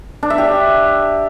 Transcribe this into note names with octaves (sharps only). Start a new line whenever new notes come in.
D4
E5
G4